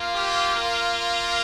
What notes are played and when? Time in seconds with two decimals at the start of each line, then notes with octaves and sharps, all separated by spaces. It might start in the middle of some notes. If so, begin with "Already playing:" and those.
Already playing: A#3 F4
0.15 G4
0.55 A#4